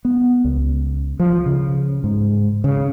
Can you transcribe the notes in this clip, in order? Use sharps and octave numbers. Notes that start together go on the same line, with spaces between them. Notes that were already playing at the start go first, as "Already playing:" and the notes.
B3
C#2
F3
C#3
G#2
C#3